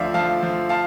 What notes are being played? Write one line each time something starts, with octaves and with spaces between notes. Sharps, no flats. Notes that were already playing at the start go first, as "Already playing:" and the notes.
Already playing: D2 F3 C5 D5 E5 F5
F3 F5 A5
F3
F5 A5